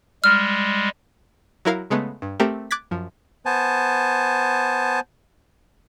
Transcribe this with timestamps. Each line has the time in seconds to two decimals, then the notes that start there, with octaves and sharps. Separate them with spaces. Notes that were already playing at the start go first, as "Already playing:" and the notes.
0.24 G3 G#3 F6
1.65 F#3 E4 A#4 F5
1.90 C#3 G#3 A3 B3
2.22 G2
2.40 A3 C4 G4 A#4
2.71 D6 F#6 G#6 A6 B6
2.91 F#2 F3
3.46 B3 C5 G#5 A5